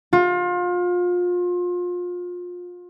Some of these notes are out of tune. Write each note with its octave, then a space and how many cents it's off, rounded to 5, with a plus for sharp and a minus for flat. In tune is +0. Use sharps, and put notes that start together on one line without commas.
F4 +30